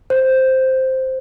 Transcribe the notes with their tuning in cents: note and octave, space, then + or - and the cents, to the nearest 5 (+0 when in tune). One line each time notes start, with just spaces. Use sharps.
C5 +0